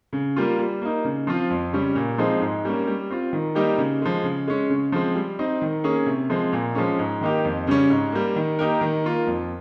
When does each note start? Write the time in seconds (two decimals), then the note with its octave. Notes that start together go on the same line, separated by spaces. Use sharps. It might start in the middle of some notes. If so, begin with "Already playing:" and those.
0.13 C#3
0.36 G3 A#3 F4
0.59 G3
0.82 A#3 D#4
1.05 C#3
1.27 F3 C4 F4
1.50 F2
1.73 C#3 G3 C#4
1.95 A#2
2.18 F3 G#3 C4 D#4
2.41 G#2
2.65 G3 A#3 C#4
2.87 G3
3.11 C4 F4
3.33 D#3
3.55 G3 A#3 D#4 G4
3.78 C#3
4.02 F3 G#3
4.24 C#3
4.48 G#3 C#4
4.70 C#3
4.92 F3 G#3 C4
5.15 G3
5.39 C4 D#4
5.62 D#3
5.84 A#3 C#4 G#4
6.06 C3
6.30 F3 G#3 C4
6.53 A#2
6.75 F3 G#3 C#4
6.99 G#2
7.21 D#3 A#3 D#4 G4
7.45 F2
7.67 C#3 G3 C#4
7.90 G#2
8.12 G3 A#3
8.36 D#3
8.59 A#3 D#4 G4 A#4
8.81 D#3
9.04 A#3 F4
9.27 F2